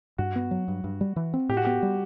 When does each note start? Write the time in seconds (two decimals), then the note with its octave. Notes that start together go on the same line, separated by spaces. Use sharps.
0.18 G2 F#4
0.36 B3
0.51 F#3
0.68 G2
0.84 G2
1.01 G3
1.16 E3
1.34 C4
1.49 A2 G4
1.57 F#4
1.65 B3 G4
1.83 G3